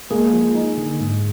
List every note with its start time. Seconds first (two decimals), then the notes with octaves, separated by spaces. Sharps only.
0.10 G#3 A#3 G#4
0.33 F3
0.55 D#4
0.77 D3
1.00 G#2